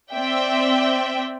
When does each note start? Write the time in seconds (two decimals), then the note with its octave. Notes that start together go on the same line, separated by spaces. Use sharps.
0.13 C4 D5 E5 G5